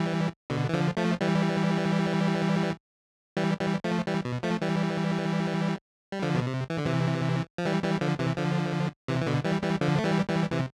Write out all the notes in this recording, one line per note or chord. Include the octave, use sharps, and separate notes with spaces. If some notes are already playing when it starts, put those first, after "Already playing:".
Already playing: E3 G3
B2 D3
E3
D3 F3
F3 A3
E3 G3
E3 G3
E3 G3
F3 A3
E3 G3
B2
F3 A3
E3 G3
G3
D3 F3
B2
C3
E3
D3
C3 E3
F3
E3 G3
E3 G3
D3 F3
C3 E3
D3 F3
C3 E3
E3
B2 D3
E3 G3
E3 G3
D3 F3
A3
E3 G3
E3 G3
C3 E3